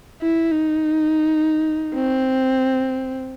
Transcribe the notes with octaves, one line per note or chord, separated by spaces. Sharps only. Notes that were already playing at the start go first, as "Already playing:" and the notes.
E4
D#4
C4